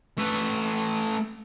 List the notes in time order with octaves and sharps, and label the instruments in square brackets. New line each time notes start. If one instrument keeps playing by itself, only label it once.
[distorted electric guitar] A3 B4